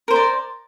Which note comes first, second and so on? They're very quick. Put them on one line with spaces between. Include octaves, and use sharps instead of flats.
A#4 C5 A#5 D5